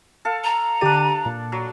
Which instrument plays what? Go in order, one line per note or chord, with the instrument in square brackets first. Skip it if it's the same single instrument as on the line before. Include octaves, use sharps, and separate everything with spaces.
[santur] A4 F5
[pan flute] A#5
[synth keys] D3 G4 D#7 [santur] D4 D5
[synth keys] A#2
[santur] F#3